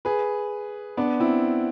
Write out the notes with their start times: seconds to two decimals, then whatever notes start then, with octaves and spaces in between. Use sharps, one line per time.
0.05 G#4 B4
0.97 B3 D4
1.20 C4 E4